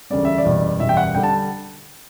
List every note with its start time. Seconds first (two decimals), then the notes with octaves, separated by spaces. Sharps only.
0.10 E1 D2 C#3 G3 D5
0.25 E5
0.38 D5
0.45 F#1 E2 B2 G3
0.80 F#1 E2 B2 G3 E5
0.89 G5
0.97 F#5
1.15 D3 G3 G5
1.23 A5